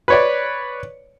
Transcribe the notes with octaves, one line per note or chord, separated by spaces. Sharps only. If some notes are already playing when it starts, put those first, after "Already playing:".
B4 C#5 D5